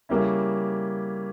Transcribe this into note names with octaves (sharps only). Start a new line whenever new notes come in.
C#3 G3 A#3 C#4 E4